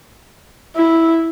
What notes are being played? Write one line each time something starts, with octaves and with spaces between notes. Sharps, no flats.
E4